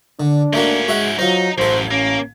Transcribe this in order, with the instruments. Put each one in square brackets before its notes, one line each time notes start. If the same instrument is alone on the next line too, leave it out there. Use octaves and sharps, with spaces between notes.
[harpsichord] D3 [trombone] D4
[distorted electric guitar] G#2 C#4 [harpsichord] A3 A#3 F#4
[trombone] G#3 [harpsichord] F#4 E5 F#5
[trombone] F#3 [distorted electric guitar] D#4 [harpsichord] F4 C5
[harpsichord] A1 A4 [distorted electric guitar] F#2 [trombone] C5
[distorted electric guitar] A#3 [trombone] C#4